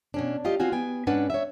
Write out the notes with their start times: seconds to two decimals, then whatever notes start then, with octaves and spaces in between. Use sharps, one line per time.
0.14 B2 C#4 D4
0.45 F4 G4 D#5
0.60 C4 F4 F#4 G#5
0.72 B3 G5 G#5
1.07 G#2 C#4 D4 B4 F#5
1.30 C#5 E5